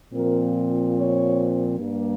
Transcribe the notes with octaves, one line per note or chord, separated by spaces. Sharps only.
A#2 F3 C4 A#4
C#5
G2 G3 A#3